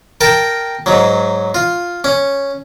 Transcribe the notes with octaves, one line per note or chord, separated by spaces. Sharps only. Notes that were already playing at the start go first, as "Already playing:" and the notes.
A#4 G5 A5
G#2 F#3
F4
C#4